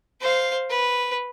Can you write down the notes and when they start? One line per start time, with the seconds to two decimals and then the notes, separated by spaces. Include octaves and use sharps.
0.20 C5 F5
0.69 B4